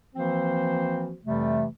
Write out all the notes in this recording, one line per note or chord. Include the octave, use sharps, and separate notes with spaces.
E3 F3 A#3 C4 F#4 C5
F2 C3 E3 G3 A3